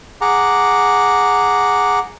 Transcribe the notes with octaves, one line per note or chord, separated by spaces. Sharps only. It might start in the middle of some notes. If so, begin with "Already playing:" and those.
G#4 F#5 A#5 D6